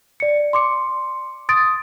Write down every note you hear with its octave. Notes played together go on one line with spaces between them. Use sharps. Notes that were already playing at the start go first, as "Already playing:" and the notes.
D5 C#7
C6 D6 C#7
C6 D#6 A6 D7